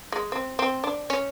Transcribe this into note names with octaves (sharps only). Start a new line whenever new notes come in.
G#3
C4
C4
D4
C#4